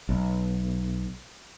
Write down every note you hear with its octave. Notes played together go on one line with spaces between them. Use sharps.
B1